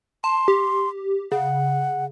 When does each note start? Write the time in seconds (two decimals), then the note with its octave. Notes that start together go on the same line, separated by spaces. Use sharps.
0.24 A5 C6
0.48 G4
1.32 C#3 F#5